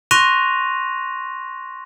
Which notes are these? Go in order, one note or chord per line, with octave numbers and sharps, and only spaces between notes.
C6 C#6 F#6 A#6 D#7 F7